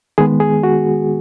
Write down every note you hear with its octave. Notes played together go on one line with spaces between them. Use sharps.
D#3 G#3 B3 G#4
G#4
F#4